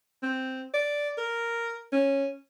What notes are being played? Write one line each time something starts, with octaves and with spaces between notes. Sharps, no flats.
C4
D5
A#4
C#4